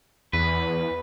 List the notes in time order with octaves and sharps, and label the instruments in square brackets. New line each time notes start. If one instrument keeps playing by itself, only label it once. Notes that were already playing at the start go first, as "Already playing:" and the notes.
[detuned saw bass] E2 [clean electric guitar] B4